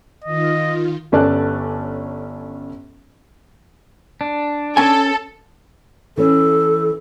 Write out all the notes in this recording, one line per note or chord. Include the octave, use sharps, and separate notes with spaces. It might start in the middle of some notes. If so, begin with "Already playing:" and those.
D#3 F4 D#5
G1 C#4 A4 D5 A5 F#6
D4
C#4 A4 G#5
E3 C#4 A4